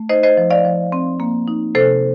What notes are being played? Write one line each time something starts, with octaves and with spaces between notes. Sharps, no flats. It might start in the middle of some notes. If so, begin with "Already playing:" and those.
Already playing: A3
D#4 C5 D#5
C5 D#5
F3
D5 F5
F3
C4
A#3
D#4
C3 A4 C5